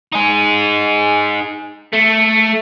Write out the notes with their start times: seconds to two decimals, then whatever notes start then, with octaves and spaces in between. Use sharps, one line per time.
0.12 D#4 G#4
1.93 A3